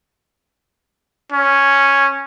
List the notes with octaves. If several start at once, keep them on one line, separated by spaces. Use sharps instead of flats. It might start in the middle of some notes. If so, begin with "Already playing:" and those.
C#4